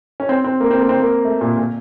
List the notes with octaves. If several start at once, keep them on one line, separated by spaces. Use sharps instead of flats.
C#4
C4
C4
A#3
C4
A#3
C4
A#3
A3
A#2
A#2